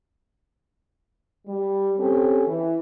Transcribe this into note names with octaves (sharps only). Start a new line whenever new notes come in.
G3
C4 C#4 G4 A4
E3